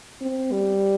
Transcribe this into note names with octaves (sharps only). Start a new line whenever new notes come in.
C4
G3